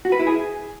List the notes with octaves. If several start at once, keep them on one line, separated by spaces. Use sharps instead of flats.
F#4
B4
E4
G#4